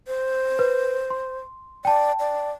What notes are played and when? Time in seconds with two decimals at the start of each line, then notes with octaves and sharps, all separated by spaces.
0.07 C5
0.59 B4
1.10 C6
1.85 D5 G5 A5
2.19 D5